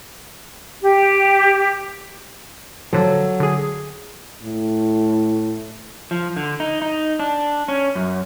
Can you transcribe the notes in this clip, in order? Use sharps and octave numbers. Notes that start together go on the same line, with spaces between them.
G4
D3 F3 F#3 A4
D3 G#4
A2
F3
D3
D#4
D#4
D4
C#4
F#2